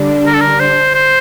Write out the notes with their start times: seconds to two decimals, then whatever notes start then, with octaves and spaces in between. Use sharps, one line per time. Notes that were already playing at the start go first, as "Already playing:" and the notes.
Already playing: D3 G3 D4
0.26 A#4
0.34 A4
0.41 A#4
0.60 C5
0.94 C5